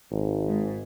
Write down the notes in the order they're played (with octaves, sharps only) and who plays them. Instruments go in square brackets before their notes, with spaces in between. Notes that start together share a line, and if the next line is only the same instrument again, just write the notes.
[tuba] G#1
[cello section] G#2